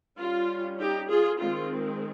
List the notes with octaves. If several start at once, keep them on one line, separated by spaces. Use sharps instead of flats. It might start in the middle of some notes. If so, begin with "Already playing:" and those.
G3 C#4 F4
D#4 G4
F4 G#4
D#3 G#3 C4 F4